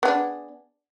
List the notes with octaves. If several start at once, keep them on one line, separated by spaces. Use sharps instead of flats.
B3 D4 G#4